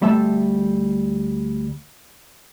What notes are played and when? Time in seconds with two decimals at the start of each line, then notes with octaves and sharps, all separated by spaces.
0.01 D2 G3 A3 E5 F5 A5